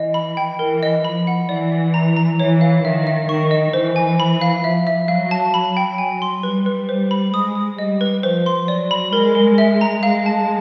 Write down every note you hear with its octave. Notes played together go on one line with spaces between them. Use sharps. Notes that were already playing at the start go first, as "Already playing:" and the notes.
Already playing: E3 D#5
B5
G5
E3 A#4
D#5
F3 B5
F#5
E3 D5
D5
A#5
A#5
E3 C#5
F5
D#3 E5
E5
D#3 C#6
D#5
E3 C5
G#5
B5
F5
F3 E5
E5
F#3 F5
A5
F#3 B5
G5
G#5
C6
G3 B4
B4
C5
B5
G#3 D#6
D#6
G3 D#5
B4
F3 C5
C6
F#3 D5
B5
G#3 A#4
A#4
E5
A#5
G#3 F5
A5